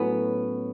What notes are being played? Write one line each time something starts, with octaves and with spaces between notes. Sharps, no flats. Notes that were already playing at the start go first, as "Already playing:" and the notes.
Already playing: A2 F#3 B3 C#4